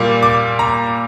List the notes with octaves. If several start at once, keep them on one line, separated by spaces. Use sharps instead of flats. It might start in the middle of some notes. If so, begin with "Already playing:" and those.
Already playing: A#2 G3 A#3
D6
A#5